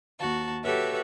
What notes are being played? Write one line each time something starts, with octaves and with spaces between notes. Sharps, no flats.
D#2 F#4 A5
F#4 G4 A4 B4 C#5 E5